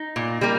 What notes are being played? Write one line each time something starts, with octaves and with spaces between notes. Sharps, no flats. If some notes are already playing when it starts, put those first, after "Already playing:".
Already playing: D#4
A#2
G3 A#3